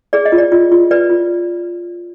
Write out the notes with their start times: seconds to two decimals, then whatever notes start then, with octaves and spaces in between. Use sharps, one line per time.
0.13 G#4 D5
0.25 D#5
0.32 F4
0.38 D5
0.52 F4
0.72 F4
0.91 B4 D5
1.10 F4